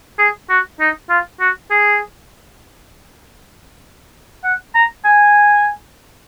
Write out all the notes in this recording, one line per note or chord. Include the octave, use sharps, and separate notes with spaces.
G#4
F#4
D#4
F4
F#4
G#4
F#5
A#5
G#5